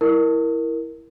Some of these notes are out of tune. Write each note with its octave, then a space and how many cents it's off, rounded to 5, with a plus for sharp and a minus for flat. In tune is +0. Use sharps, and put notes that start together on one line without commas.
E4 +0 A#4 +0